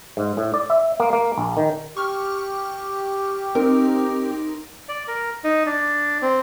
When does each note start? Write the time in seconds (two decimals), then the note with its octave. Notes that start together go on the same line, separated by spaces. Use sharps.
0.17 G#2
0.37 A2
0.54 D5
0.70 E5
1.00 A#3
1.13 A#3
1.38 A#1
1.57 D#3
1.97 G4 C#6 F6
3.55 C4 D#4 A#4
4.89 D5
5.08 A#4
5.44 D#4
5.67 D4
6.22 C4